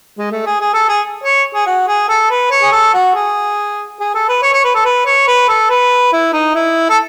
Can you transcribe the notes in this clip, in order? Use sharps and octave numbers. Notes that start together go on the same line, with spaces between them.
G#3
A3
G#4
G#4
A4
G#4
C#5
G#4
F#4
G#4
A4
B4
C#5
G#4
A4
F#4
G#4
G#4
A4
B4
C#5
C#5
B4
A4
B4
C#5
B4
A4
B4
E4
D#4
E4
A4